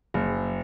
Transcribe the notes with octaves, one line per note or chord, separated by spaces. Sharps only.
F#1